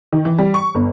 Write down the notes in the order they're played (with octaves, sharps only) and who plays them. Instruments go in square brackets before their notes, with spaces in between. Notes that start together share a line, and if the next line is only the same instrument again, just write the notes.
[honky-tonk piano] D#3
E3
G3
C#6
G1